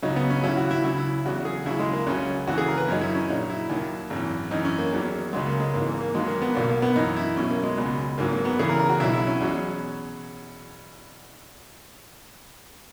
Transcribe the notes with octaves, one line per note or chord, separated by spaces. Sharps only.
C#2 C#3 F#3 D#4
B3
C#4
D#2 C#3 F#3 E4
F#4
E4
C#2 C#3 F#3 E4
E4
E2 C#3 F#3 F#4
G#4
D#2 C#3 F#3 E4
G#3
A#3
C#2 C#3 F#3 C#4
D#2 C#3 E3 F#4
G#4
A#4
B4
F#2 D#3 F#3 D#4
E4
C#4
A#1 A#2 F#3 D#4
E4
D#2 D#3 F#3
G#1 F#2 E3
F#2 E3 D#4
C#4
A#3
E2 D#3 F#3
C#2 C#3 F#3 G#3
A#3
G#3
G#1 G#2 E3 A#3
A#3
A#3
D#2 D#3 F#3 G#3
A#3
B3
B1 A#2 F#3 A#3
A#3
B3
F#2 E3 D#4
E4
B1 B2 F#3 C#4
A#3
G#3
C#2 B2 F#3
G#1 G#2 F#3 A#3
A#3
B3
E2 C#3 E3 G#4
A#4
A#4
F#4
B1 B2 F#3 E4
E4
C#4
E2 B2 F#3